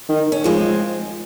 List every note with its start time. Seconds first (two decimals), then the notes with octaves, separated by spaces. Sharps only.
0.09 D#3
0.32 C#4
0.44 F3 G#3 C4